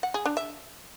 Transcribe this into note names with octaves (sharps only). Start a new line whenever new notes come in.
F#5
G#4
D4
E5